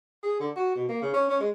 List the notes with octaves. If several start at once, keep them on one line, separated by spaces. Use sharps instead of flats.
G#4
D3
F#4
B2
A#3
C#3
C#4
C#4
G#3